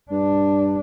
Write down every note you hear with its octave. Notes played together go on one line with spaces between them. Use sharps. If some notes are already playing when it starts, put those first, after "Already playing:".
G2 D4